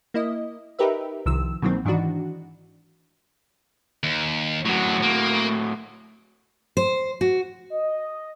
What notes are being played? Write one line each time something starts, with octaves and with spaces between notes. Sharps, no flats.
A#3 E4 D#5
D#4 G4 A#4 B4 E5
C2 D#3 F3 E6
B2 D#3 E3 F#3 A#3 C4
G#2 D#3 E3 D4 F#4
D#2
F#2 A2 F#3 F#4
A#3
C5
F#4
D#5